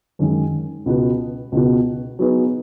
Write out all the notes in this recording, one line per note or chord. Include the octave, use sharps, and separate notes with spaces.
F#2 D#3 G#3
C#2 B2 B3 F#4
C#2 B2 B3 F#4
F#3 B3 D#4 G#4 B4